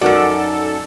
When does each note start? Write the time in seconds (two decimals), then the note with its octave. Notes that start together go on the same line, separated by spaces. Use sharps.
0.01 F#2 C#4 D#4 F#4 A4 A#4 D5 F#5